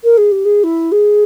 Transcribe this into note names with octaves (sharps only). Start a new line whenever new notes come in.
A#4
G#4
G4
G#4
E4
G#4